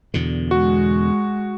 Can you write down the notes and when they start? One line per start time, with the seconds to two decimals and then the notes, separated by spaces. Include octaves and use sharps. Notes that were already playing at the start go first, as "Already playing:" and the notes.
0.14 E2 B2 D3
0.51 G#3 F#4